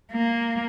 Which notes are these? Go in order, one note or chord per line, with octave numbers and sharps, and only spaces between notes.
A#3